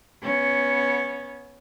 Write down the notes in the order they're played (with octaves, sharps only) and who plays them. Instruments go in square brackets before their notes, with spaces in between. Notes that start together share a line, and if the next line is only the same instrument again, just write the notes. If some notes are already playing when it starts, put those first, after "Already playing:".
[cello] B3 C#4